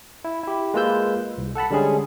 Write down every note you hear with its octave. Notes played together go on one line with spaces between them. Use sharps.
E4
E4 G4
G#3 A#3 F4 B4 E6 G6
C2
A4 F#5 A5 B5
D3 G3 G#3 C#4 G#4